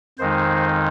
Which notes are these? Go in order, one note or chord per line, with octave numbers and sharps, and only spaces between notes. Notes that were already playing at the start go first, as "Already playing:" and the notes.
F2 D#3 G#3 D#4 C5